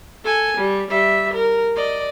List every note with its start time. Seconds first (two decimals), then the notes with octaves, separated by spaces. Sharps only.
0.24 A4 G#5
0.57 G3
0.90 G3 E5
1.34 A#4
1.76 D5 D#5